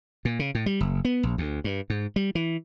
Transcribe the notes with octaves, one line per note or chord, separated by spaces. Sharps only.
A#2
C#3
A2
G3
F#1
B3
A#1
D2
G2
G#2
G3
E3